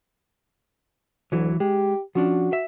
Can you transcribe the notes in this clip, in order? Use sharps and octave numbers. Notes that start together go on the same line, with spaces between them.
D2 E3 F#3
G#3 G4
F3 C#4 D4 F#4
E5